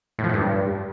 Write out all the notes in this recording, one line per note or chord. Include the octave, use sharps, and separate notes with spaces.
A2
F3
A2
G2